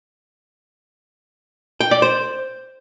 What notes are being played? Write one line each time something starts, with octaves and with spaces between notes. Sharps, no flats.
G5
D5
C5